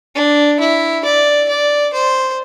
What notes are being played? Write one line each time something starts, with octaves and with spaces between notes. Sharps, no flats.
D4
E4
D5
D5
C5